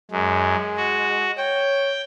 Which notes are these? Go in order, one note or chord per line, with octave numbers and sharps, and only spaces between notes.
F#2 G#3
F#4
C#5 G5